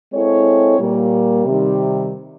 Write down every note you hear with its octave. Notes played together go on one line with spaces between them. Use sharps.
G#3 C4 E4 A4 C#5
A#2 G3 A#3
C3 D#3 G3